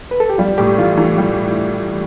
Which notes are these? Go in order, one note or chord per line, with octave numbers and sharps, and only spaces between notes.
B4
A4
G4
G3 F4
A2 G4
E3 F4
E3
G3